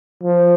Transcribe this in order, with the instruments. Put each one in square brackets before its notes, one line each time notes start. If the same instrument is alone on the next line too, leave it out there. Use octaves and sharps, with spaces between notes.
[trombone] F3